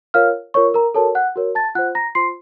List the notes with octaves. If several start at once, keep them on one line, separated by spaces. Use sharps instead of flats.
F4 A#4 C#5 F5 F6
F4 A#4 C#5 C#6
A#4 A#5
F#4 A4 A#4 C#5 A5
F#5 F#6
F#4 A#4 C#5
A5 A6
F4 C5 F#5 F#6
A#5 A#6
F4 C5 C6 C7